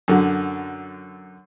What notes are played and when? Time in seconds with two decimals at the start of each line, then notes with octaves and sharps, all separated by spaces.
0.08 F#2 D3